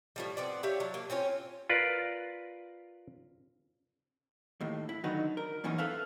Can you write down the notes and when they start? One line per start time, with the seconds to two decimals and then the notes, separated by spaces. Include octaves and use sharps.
0.16 A2 F3 G3
0.37 B3 C4 D5
0.63 E4 G4 C#5 F5
0.80 F#3 D4
0.94 A#3
1.10 C4 C#4 F4 C#5
1.70 F4 A#4 B4 D5
4.61 D#2 A2
4.89 E4
5.04 D3 D#3 F#3 D#4 F#4 B4
5.37 A#4
5.64 F#2 A#2 E3 C#4 D#4
5.78 A4 B4 E5 F5 A5